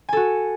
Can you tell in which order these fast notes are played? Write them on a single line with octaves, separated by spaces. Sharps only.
G#5 A4 F#4